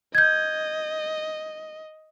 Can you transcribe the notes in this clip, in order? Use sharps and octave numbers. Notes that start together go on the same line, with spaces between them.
D#5 G6 G#6